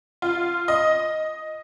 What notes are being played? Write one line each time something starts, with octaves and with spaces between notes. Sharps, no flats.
F4
D#5